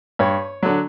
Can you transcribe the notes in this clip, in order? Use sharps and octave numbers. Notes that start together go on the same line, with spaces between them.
G2 C#5
D3 F#3